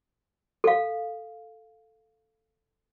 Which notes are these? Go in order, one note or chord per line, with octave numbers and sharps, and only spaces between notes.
A4 F5